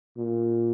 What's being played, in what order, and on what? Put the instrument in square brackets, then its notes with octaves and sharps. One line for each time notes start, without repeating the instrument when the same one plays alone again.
[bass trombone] A#2